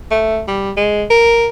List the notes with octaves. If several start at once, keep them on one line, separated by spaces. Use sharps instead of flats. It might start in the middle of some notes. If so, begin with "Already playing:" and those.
A3
G3
G#3
A#4